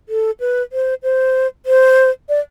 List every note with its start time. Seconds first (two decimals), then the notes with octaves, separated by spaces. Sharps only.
0.09 A4
0.40 B4
0.72 C5
1.03 C5
1.66 C5
2.29 D5